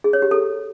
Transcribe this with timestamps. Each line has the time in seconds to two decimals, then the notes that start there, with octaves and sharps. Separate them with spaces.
0.04 G#4
0.13 C#5
0.22 G4
0.31 A4